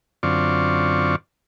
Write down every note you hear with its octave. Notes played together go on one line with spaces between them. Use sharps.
F#2 D3 C4 F4 D5 C#6